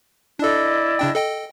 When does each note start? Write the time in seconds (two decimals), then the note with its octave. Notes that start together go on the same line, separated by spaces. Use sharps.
0.39 D4 E4 A4 D5 D#5
0.99 C#3 D4 G5
1.15 A4 D#5 G5